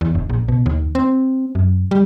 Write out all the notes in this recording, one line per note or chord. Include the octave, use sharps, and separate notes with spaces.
E2
E1
A#1
B2
D#2
C4
F#2
G3